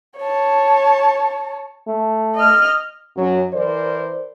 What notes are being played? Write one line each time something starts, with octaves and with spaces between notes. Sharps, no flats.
C#5 A5
A3
D#5 F6
F#2 F#3
E3 A#4 C5 D5